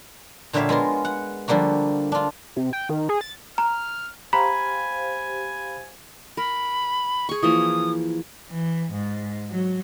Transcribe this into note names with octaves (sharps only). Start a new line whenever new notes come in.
A#2 D3 G3 C#5 E5 F5
G#3 B3 F4 A#4
F#5
D3 F3 G3 A#3 F#4
D4 F4
C3
G5
D#3
G#4
A6
A#5 F6
G4 C5 F5 G#5 A#5 B5
A#4 B5
G#4 C#6
E3 F3 A#3 D#6
E3
G#2
F#3